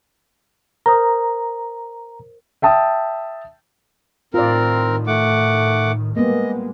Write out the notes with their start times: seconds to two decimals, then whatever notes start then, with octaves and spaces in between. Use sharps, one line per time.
0.86 A#4 C5 A#5 D#6
2.62 E5 G5 A5 D#6
4.34 A2 D#3 C4 F4 A#4 D5
5.07 A3 F#5 D6
6.16 A#2 G3 G#3 A#3 B3 D#5